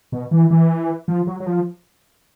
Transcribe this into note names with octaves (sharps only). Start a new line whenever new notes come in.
B2
E3
E3
F3
F#3
F#3
F3